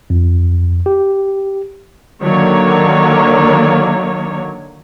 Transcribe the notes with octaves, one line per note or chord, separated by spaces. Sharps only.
F2
G4
D3 D#3 F#3 A#3 C#5